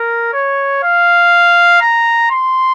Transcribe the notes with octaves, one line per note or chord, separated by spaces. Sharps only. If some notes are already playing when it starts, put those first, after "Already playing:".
Already playing: A#4
C#5
F5
A#5
C6